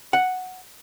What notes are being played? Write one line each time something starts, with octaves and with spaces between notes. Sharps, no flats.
F#5